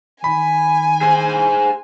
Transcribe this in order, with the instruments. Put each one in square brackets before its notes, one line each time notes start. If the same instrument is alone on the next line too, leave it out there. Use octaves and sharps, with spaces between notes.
[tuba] D#3 [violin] G#5 [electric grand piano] B5
[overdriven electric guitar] G#4 C5